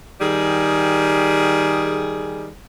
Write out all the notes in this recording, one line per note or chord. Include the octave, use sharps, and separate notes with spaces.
D#3 G3 G#4